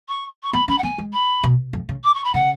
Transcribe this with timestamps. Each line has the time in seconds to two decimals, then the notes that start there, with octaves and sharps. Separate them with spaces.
0.08 C#6
0.43 C#6
0.52 B3 B5
0.68 C#4 B5
0.78 F#5
0.83 B3 G#5
0.98 G#3
1.13 B5
1.43 B2
1.73 F2
1.89 C#3
2.04 D6
2.14 C#6
2.24 B5
2.34 C#3 F#5